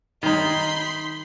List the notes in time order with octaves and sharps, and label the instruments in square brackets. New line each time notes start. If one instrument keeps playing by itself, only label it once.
[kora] D#3 D#4 [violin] B5 C6